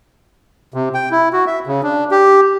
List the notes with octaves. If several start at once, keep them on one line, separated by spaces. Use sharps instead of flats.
C3
G5
E4
F#4
E5
C#3
D4
G4